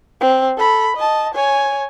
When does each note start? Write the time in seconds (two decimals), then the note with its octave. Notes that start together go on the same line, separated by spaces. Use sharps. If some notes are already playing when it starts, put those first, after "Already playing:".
0.21 C4
0.57 A4 B5
0.96 D#5 A5
1.34 C#5 G#5